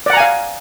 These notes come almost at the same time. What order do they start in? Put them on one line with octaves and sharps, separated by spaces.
D5 F#5 A#5 G#5 F5